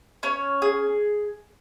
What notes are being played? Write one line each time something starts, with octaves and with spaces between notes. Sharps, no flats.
C#4 C#5
G#4